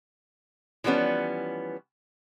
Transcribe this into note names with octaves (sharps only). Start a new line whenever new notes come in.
E3 F3 G3 B3 C#4